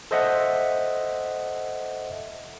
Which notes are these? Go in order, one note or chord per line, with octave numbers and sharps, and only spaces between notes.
A4 C5 D#5 E5 F#5